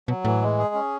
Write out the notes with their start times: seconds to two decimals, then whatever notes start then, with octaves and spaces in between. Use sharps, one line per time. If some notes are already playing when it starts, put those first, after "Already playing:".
0.08 B2 F#3
0.25 A2 E3
0.42 G#3
0.58 G#4
0.75 C#4